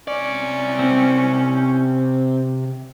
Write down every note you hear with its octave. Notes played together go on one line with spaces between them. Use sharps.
C3 C#4 D5
C4